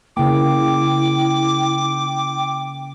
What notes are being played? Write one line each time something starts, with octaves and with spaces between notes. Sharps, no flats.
C#3 A#3 E4 G5 D6